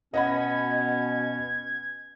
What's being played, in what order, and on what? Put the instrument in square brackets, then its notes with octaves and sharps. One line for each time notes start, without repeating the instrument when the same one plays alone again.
[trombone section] B2 [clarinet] C#4 [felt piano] D#5 F#5 B5 [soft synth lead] G#6